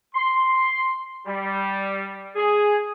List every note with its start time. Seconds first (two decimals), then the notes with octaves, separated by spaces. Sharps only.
0.14 C6
1.26 G3
2.35 G#4